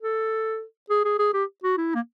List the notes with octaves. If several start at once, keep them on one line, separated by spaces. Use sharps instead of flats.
A4
G#4
G#4
G#4
G4
F#4
E4
A#3